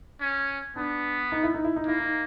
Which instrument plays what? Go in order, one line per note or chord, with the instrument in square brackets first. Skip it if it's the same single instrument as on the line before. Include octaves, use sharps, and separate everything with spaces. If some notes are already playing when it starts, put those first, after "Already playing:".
[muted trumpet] C#4
[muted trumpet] B3 [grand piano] D4
[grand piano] D#4
E4
D#4
E4
D#4
[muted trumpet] A#3 [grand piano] E4
[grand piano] D#4